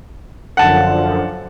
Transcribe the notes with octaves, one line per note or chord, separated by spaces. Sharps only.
F#2 D3 F3 F#5 A5